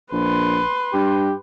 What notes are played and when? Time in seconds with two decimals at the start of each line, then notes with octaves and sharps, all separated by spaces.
0.12 A#1 B4 C6
0.93 G2 G4